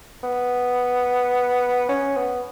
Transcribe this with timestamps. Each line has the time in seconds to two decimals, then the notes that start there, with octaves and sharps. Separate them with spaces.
0.23 B3
1.89 C#4
2.16 B3